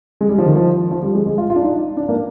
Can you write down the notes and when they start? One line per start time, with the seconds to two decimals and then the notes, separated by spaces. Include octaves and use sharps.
0.21 G#3
0.29 G3
0.38 F3
0.46 D#3
0.55 F3
0.91 F3
1.03 G3
1.15 G#3
1.26 G#3
1.38 F4
1.50 F4
1.56 D4
1.62 D#4
1.97 D4
2.09 A#3